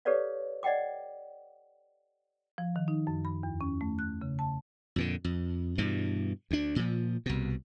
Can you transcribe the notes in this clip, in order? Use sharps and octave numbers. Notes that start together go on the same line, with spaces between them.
G4 A4 B4 C#5 D5 F5
D5 D#5 F#5 G5 D6
F3
D#3
D#4
F#2
B5
E2
C#4
A3
F#6
C#3
A5
F2 A#2 D3
F2
G2 B2 E3
D2 D4
A#2 F3
C2 B2